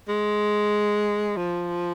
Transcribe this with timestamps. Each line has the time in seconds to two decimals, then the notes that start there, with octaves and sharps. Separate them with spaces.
0.09 G#3
1.37 F3